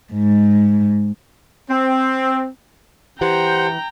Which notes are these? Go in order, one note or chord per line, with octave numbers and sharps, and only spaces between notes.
G#2
C4
E3 G4 C5 F#5 G5 A#5